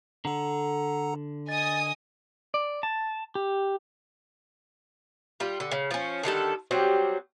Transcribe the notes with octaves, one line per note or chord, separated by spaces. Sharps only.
D3 A4 F#5 A#5
D#5 G#5 D#6 A6
D5
A5
G4
G3 F4
D3
C#3
F3 C#4
D3 D#3 G3 A4
F#3 G3 C4